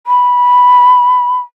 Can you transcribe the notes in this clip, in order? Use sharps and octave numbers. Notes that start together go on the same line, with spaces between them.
B5